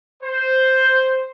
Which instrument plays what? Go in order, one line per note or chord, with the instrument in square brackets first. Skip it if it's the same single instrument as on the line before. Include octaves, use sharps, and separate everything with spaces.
[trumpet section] C5